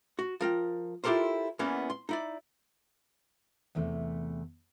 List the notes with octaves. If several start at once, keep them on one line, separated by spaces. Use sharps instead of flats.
F#4
F3 A#4 G5
E4 F4 G4 A4 A#4 C5
E2 E3 A#3 B3 C#4
C6
D#4 E4 D5
E2 C3 E3 A3